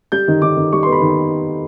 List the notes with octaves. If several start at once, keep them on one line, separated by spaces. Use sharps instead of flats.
G3 G6
D#3
D#3 D6
D#3
G3 C#6
C6
B3
B5
D#3